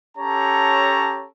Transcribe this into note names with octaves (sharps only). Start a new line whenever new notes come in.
C#4 G4 A4 C#5 A5 A#5